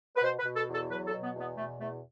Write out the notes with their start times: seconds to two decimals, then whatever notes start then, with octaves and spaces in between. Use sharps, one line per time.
0.16 B4
0.23 B2 C5
0.39 B4
0.45 B2
0.56 A4
0.68 E2
0.73 A4
0.90 F#3 B4
1.07 A4
1.12 B2
1.24 B3
1.35 E2 B3
1.57 B2 A3
1.79 E2 A3